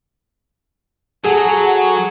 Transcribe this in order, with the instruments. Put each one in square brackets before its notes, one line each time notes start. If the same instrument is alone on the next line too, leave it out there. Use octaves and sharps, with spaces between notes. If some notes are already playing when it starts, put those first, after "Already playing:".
[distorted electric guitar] F#3 [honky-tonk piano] G#4 [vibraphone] A4 G#5 A5 [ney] F#5